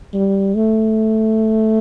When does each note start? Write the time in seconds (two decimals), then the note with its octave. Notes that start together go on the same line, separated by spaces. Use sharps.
0.14 G3
0.55 A3